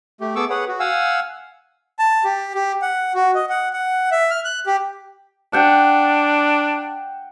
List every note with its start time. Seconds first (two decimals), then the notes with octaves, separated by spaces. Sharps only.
0.21 A3 G4
0.35 B3 G#4 A4 C#6 D6 E6
0.50 G#4 B4 C#5 F#5
0.68 F#4
0.80 F5 F#5 G#5 E6
1.99 A5
2.24 G4
2.54 G4
2.82 F#5
3.15 F#4
3.35 D#5
3.50 F#5
3.73 F#5
4.12 E5
4.31 F6
4.45 F#6
4.66 G4
5.53 D4 F#5 G5